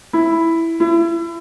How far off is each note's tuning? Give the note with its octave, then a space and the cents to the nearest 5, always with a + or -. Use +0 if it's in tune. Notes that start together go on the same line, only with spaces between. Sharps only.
E4 +0
E4 +30